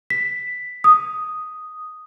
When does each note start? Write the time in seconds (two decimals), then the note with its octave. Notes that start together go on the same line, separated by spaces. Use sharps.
0.10 B6
0.84 D#6